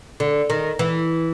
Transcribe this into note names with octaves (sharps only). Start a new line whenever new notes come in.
D3
D#3
E3